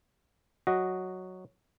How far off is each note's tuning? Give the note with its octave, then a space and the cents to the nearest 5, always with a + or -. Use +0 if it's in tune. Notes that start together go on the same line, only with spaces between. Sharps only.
F#3 +0 F#4 +0 D#5 +0